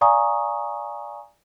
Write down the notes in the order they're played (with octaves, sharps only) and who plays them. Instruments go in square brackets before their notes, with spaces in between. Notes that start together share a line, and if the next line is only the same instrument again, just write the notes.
[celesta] D5 F5 G#5 A#5 C#6 D#6